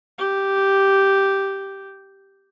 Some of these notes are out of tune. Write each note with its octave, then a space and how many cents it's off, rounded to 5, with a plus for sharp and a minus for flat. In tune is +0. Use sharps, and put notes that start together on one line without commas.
G4 -5